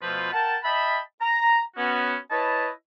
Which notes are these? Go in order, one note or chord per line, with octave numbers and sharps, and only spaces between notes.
B2 F3 A3 F4 B4 C5
A#4 F#5 G5 A5
D#5 E5 G5 A5 B5
A#5
B3 C#4 F#4
E4 B4 C#5 D#5 A5